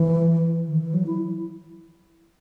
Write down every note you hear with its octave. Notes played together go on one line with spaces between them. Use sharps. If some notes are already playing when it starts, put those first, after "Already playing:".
Already playing: E3
D#3
E3
F#3
E4